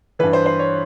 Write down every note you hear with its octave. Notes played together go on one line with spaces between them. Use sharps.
G2 E3 B4
C5
C5
C#5